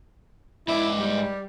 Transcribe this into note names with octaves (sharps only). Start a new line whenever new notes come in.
G#2 E4 D5
G3